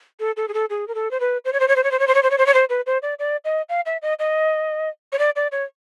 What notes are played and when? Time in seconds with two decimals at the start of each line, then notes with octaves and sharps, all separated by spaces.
0.20 A4
0.37 A4
0.48 G#4
0.54 A4
0.70 G#4
0.88 A#4
0.95 A4
1.11 C5
1.20 B4
1.45 C5
1.53 C#5
1.60 C5
1.68 C#5
1.76 C5
1.84 C#5
1.91 C5
1.99 C#5
2.08 C5
2.15 C#5
2.23 C5
2.31 C#5
2.38 C5
2.46 C#5
2.54 C5
2.69 B4
2.86 C5
3.02 D5
3.19 D5
3.45 D#5
3.69 F5
3.86 E5
4.02 D#5
4.19 D#5
5.12 C#5
5.19 D5
5.36 D5
5.52 C#5